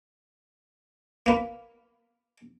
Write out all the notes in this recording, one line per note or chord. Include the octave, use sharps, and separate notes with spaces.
A#3 B4